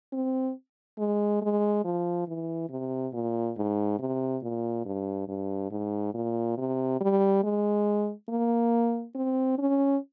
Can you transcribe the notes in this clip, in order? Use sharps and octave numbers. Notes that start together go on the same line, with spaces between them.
C4
G#3
G#3
F3
E3
C3
A#2
G#2
C3
A#2
G2
G2
G#2
A#2
C3
G3
G#3
A#3
C4
C#4